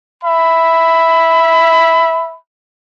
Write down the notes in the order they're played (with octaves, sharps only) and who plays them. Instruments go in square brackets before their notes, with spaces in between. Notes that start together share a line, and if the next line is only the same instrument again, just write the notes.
[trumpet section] E5 B5